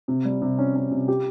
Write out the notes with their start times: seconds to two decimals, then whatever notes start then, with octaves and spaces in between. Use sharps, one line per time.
0.08 C3
0.25 G3
0.42 C3
0.58 C#4
0.76 C#4
0.91 C3
1.08 G4